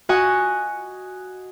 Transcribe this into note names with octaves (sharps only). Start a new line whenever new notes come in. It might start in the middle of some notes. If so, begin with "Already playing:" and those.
F#4 D#5 F#5 G#5